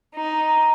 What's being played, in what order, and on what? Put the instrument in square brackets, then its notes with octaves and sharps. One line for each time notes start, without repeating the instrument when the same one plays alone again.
[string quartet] D#4